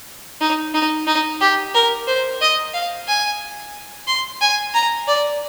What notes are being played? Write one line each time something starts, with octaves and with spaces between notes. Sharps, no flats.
D#4
D#4
D#4
G4
A#4
C5
D#5
F5
G#5
C6
G#5
A#5
D5